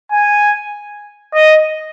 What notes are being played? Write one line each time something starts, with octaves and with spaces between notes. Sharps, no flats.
G#5
D#5